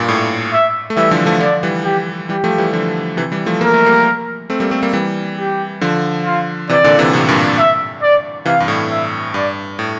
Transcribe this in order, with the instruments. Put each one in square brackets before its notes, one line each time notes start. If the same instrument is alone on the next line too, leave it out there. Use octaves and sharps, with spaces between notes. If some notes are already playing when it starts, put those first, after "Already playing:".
Already playing: [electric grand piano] G2 A#2
A2
[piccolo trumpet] E5
[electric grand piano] A3
[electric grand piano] E3 G3 [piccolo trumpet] E5
[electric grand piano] D3 F3
F3 A3
[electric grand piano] D3 F3 [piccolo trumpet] D5
[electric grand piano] E3 G3
[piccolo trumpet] G4
[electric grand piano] E3 G3 [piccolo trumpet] G4
[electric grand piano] F3 A3
E3 G3
D3 F3
C3 E3
E3 G3
F3 A3
[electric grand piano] A#3 [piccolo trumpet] A#4
[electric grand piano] A3
G3 A#3
A3 C4
G3 A#3
A3 C4
G3 A#3
E3 G3
[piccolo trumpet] G4
[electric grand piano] D3 F3
[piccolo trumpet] F4
[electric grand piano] C3 E3 [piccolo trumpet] D5
[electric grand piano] A#2 D3
C3 E3
A2 C3
G2 A#2
[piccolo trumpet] E5
D5
[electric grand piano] C3 E3 [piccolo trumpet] F5
[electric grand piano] G2
A2
[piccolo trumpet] E5
[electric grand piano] G2 [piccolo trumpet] D5
[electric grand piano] A2